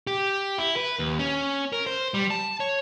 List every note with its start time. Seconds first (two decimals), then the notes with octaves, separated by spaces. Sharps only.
0.07 G4
0.58 E4
0.76 B4
0.99 D#2
1.19 C#4
1.73 A#4
1.86 C5
2.14 G3
2.30 A5
2.60 C#5